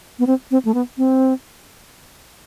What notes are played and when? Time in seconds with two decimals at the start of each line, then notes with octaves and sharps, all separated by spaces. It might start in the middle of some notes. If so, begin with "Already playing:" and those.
0.19 B3
0.27 C4
0.51 C4
0.65 A3
0.74 B3
0.98 C4